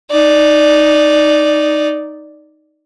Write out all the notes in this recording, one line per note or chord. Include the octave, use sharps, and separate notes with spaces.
D#4 D5